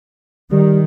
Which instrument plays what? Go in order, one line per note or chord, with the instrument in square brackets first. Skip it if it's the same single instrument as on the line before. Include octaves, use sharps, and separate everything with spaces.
[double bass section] D#3 [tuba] G3